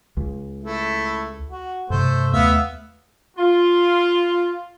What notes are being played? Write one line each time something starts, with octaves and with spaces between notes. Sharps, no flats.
C#2
A3 E4
F#4
G2 C3 A3 C5
D#2 A3 B3 E5 F5
F4